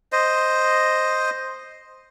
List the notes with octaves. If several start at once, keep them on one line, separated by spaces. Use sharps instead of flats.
C5 D#5